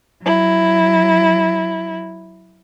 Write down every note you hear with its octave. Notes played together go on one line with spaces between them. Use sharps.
F#3 E4